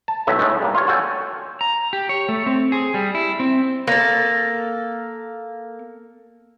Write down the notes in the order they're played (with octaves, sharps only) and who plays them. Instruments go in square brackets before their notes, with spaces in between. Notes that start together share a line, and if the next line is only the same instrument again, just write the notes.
[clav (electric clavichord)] A5
B1 A2 F#3 E5
A2 G#3 A3
G3 A#3
F4 C#5
F#4 A4 C#5 G5 G#5
[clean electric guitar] A#5
G4
C#5
A3
C4
G#4
G3
E4
C4
[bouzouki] A#3 A4